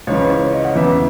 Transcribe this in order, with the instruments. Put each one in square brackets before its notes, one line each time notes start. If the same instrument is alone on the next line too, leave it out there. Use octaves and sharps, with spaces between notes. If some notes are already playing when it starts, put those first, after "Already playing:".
[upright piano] C#2 C#3 E3 C#5
C#5
D#5
F#5
E2 C#3 E3 E5